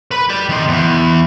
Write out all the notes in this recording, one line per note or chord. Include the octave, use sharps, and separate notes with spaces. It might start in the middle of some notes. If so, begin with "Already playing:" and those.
B4 B5
G4 D5
D#3 C4
E2